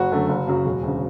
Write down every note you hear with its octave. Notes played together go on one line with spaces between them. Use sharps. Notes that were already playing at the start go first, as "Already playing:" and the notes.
Already playing: F#1 F#4
F#2 D3 F#3 A3
F#1
F#2 C#3 F#3
E1
D2 C#3